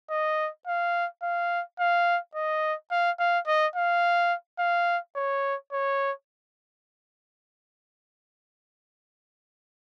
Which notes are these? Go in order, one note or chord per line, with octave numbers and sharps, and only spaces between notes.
D#5
F5
F5
F5
D#5
F5
F5
D#5
F5
F5
C#5
C#5